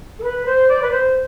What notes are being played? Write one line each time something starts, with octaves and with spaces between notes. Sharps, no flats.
A4
B4
C5
D5
B4
C5